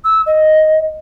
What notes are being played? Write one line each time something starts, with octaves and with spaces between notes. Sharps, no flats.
E6
D#5